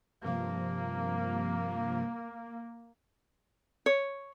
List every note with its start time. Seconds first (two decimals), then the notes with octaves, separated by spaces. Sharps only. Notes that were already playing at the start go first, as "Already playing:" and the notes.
0.24 G2 C3 F3 A#3
3.86 C#5